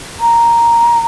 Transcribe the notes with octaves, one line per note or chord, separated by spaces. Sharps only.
A#5